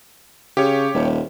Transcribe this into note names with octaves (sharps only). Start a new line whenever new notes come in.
C#3 G4 C#5
D#1